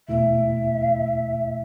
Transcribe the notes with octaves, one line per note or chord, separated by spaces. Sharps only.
E2 B2 A3 E4 E5